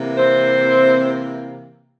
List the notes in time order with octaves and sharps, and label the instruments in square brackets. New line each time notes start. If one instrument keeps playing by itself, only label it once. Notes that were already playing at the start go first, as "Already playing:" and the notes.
Already playing: [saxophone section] C3 E3 A#3
C4 C5